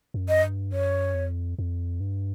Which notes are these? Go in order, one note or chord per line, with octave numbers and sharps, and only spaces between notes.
F#2
D#5
G2
F#2 C#5
F2
F2
G2